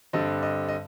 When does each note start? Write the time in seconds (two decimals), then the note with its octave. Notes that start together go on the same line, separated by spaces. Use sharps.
0.13 G2 D3 G3 C4 D#5
0.43 D#5
0.69 D#5